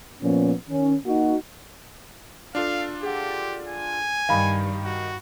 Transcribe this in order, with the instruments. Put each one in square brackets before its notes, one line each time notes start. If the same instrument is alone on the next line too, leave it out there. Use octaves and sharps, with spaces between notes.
[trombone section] A#2 F3 B3 C#4
D#3 C#4
A#3 D#4 F#4
[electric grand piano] D4 F4 A4 [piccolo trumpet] F5
[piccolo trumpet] G4 [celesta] G#4 F#5
[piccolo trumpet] G#5
[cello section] G2 [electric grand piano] D#3 G3 D#4 [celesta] F5 B5
[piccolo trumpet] F#4